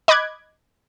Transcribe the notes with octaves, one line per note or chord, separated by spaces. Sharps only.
D#5 B5 D6 F#6 G#6